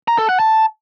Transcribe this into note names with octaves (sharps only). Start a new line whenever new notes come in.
A#5
A4
F#5
A5